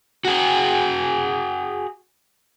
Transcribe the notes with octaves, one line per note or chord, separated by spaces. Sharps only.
F#4 G#4